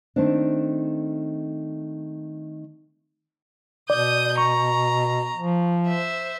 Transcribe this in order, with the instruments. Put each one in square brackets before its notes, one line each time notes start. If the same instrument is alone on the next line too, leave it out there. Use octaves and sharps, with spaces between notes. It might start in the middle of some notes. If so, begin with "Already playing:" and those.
[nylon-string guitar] D#3 A3 C4 D4
[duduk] B2 [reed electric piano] D5 [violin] D#6 G6
[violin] A#5 [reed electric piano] C#6
[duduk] F3
[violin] C5 E5